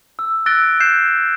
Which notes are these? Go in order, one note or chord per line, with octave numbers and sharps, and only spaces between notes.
E6
E6 F#6 A6 A#6 D7 G7
F#6 G6 C7 E7